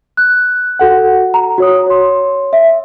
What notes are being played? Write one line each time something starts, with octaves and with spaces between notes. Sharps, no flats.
F#6
F#4 A4 F#5
A#5
F#4 C#5 D#6
C#5 C6
E5